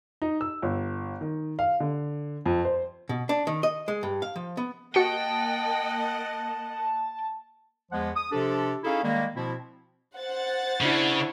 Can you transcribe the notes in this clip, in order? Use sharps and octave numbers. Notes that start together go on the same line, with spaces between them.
D#4
E6
G1
D#3
F5
D3
F2
C5
B2
D4
D#3
D#5
G#3
G2
F5
F3
B3
A#3 F#4 D#5 F#5 G5 A5 C#7
E2 F3 G#3 B3 F#5
D#6
C3 F3 D4 G4 A4
C#4 D#4 E4 G#4 A4 F5
D#3 G3 G#3 A#3
B2 F3 C4 E4
C5 F#5 A6
C#3 D4 E4